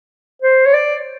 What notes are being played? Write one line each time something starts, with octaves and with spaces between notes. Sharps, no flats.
C5
C#5
D5